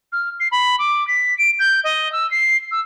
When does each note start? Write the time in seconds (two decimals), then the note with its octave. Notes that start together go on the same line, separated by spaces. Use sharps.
0.13 F6
0.40 C7
0.52 B5
0.79 D6
1.08 B6
1.38 D7
1.59 G6
1.84 D#5
2.12 E6
2.31 C7
2.71 E6